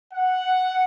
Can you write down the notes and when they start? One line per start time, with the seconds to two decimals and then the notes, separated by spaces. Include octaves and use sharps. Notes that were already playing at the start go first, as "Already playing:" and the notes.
0.13 F#5